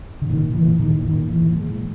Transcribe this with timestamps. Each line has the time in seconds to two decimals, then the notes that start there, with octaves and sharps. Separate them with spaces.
0.22 D3
0.28 A#2 D#3
0.53 E3
0.67 A#2
0.80 D#3
1.05 A#2 D#3
1.30 E3
1.43 A#2
1.56 G#3